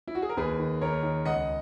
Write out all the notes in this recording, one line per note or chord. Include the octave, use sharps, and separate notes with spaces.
E4
F#4
G#4
A#4
D#2 G#4 B4
D#3
D#2 A#4 C#5
D#3
C#2 D#5 F#5